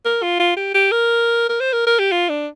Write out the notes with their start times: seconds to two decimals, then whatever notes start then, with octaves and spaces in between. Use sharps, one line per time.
0.05 A#4
0.22 F4
0.39 F4
0.57 G4
0.74 G4
0.91 A#4
1.49 A#4
1.60 C5
1.73 A#4
1.87 A#4
1.99 G4
2.12 F4
2.29 D4